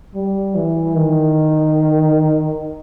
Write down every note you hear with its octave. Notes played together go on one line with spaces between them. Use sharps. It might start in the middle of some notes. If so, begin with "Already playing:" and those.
G3
E3
D#3